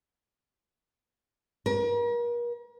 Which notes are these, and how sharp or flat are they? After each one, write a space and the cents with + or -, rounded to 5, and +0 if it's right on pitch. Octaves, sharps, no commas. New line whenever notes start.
A#4 +40